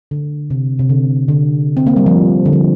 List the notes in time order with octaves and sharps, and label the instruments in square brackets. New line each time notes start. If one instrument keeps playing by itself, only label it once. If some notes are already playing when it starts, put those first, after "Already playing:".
[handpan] D3
C3
C3
D3
D3
C4
A#3
G3
F3
D3
F3